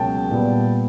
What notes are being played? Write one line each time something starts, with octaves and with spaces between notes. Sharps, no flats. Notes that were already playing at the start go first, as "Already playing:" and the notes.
Already playing: C#2 B2 F#3 A#3 G5 A5
A#2 G3 B3